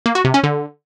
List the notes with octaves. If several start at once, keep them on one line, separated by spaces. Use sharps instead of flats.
A#3
F#4
C3
C#4
D3